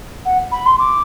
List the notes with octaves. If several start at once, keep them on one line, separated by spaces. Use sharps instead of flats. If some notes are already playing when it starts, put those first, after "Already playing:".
F#5
B5
C6
D6